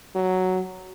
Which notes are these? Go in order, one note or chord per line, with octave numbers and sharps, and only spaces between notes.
F#3